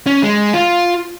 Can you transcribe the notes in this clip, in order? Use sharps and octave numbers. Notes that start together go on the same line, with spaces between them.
C#4
G#3
F4